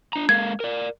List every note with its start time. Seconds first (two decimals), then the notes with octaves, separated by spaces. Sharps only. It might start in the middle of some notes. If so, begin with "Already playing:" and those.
0.13 D4 A#5
0.29 G#3 A#3 F5 G#6
0.60 A#4 D5